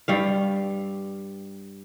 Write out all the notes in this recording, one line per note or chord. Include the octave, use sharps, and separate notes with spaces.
G2 G3 F5